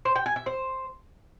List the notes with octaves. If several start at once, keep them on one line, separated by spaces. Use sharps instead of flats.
C5
G5
G#5
E5
C5